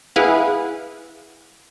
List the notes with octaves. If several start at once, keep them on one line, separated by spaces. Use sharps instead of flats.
E4 G#4 B4 F5 F#5